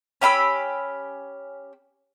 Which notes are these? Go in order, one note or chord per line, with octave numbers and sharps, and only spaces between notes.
C#4 G4 B5 E6